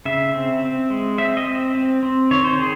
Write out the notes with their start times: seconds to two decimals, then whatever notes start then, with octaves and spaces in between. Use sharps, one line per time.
0.05 C#3 E5
0.34 C4
0.63 C4
0.90 G#3
1.18 C4 E5
1.37 D#5
1.47 C4
1.75 C4
2.03 C4
2.31 D#3 C#5
2.44 C5
2.59 D#3 G#4